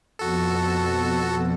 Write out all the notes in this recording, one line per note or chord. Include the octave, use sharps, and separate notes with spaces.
F2 B2 F#4 A4